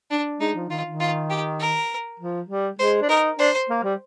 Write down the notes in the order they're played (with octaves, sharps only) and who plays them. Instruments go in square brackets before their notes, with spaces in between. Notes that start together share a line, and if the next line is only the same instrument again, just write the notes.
[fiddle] D4
[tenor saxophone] G#3 [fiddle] D#4
[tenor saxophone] F3
[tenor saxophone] D#3 [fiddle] F4
[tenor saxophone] D#3
[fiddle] F4
G4
A#4
[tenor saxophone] F3
G3
[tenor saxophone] G#3 [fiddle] C5
[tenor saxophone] D4
[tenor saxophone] D#4 [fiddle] A#4
[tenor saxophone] D4 [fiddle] C5
[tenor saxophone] A#3
G3